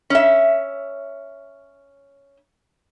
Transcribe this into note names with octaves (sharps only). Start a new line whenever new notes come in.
C#4 E5